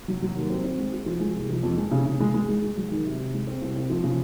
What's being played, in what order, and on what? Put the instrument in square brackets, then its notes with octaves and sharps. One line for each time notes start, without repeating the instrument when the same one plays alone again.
[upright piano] F#3
F#3
D#2
C4
C4
G#3
F#4
F3
G#3
C2
F3
F2
G#3
C#3
C#3
G#3
G#3
G#3
G#3
F#3
D#3
C3
C3
G#3
C4
C2
C4
F3
C#3